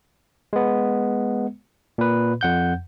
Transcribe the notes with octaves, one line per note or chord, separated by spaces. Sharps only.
G#3 B3
A#2 B4
F2 F#5 G6